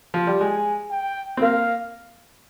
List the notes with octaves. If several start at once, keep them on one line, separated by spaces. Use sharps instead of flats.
F3
G3
G#3 G#5
G5
C4
A#3 F5